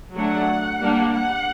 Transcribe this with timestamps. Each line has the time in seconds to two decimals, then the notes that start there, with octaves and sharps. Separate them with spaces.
0.15 F#3 A3 D4 F#5
0.79 G3 A#3 D4
1.12 F#5